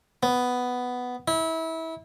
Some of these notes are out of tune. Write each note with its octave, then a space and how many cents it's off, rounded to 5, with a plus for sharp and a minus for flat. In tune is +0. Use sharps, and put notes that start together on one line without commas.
B3 +5
E4 -25